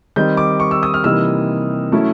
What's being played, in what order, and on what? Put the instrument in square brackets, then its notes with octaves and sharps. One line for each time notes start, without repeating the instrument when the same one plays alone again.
[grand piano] D#3 G3 C4 D#4 G6
D6
C#6
E6
D#6
F6
C3 E3 G3 A#3 D#4 E6
F#3 A3 C#4 E4